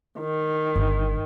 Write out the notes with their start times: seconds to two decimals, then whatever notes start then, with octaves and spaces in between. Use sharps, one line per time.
0.19 D#3
0.76 G1